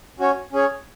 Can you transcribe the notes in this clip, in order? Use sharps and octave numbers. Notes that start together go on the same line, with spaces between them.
C#4 F#4 C#5
C#4 G#4 C#5